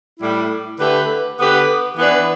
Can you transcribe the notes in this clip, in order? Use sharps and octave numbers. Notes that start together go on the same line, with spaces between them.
A2 G3 E4
D3 A3 G4 B4
D3 B3 G4 B4
E3 B3 D4 B4